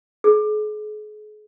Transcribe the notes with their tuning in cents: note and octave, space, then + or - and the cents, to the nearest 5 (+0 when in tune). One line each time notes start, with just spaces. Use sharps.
G#4 +40